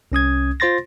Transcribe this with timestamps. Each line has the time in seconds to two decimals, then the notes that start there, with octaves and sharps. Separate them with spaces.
0.12 C2 C#4 D#6 G#6
0.60 F4 C5 C6 A6 A#6